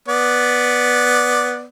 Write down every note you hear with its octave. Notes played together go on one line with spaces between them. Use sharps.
B3 D5